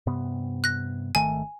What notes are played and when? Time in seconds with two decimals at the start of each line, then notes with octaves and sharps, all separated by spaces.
0.06 G2 C3 B3
0.64 F#6 A#6
1.15 G#1 D#3 A3 G#5